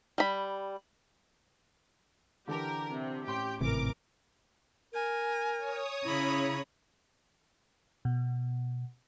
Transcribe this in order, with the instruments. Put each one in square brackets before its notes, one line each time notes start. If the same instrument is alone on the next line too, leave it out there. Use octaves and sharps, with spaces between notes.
[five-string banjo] G3 B5
[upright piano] D3 E3 A5 [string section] G4 A#4
[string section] C3
[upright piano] A1 C6 [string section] G4 G5
[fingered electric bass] G#1 A2 C3 [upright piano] E3 [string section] A#4 D6
[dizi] A#4 [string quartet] G#5
[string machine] C#5 D#6
[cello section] C#3 [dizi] E4 [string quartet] A#5 B5
[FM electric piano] B2